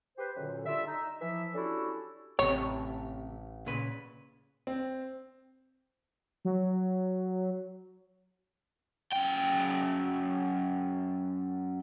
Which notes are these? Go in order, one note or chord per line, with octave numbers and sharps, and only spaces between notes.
G4 B4 C5
F#2 A#2 D3
G3 D4 F4 A4 D5 E5
D#4
E3 F3 E5
C#4 D4 E4 F#4 G4 A4
A1 C3 A3 G4 C#5
A#2 C#3 B4
C4
F#3
F#2 G5